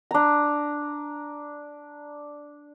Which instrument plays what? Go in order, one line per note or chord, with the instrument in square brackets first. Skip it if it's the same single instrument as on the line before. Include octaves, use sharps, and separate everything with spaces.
[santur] D4 A#5